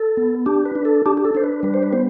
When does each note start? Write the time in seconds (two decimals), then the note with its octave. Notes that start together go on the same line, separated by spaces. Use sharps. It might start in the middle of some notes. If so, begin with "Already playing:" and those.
Already playing: A4
0.17 B3
0.46 D4 G4
0.66 B4
0.75 D4
0.85 A4
1.06 D4 G4
1.17 G4
1.25 A4
1.35 D4 C5
1.44 B4
1.63 G3 B4
1.74 C5
1.83 B4
1.93 B3 C5